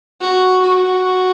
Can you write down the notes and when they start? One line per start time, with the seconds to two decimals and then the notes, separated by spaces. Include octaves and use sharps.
0.21 F#4
0.62 F#4